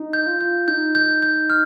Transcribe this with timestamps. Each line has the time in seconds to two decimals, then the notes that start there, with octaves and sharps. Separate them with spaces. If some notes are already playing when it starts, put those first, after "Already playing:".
Already playing: D#4
0.13 G6
0.27 F4
0.41 G6
0.68 D#4 G6
0.95 G6
1.22 G6
1.50 F6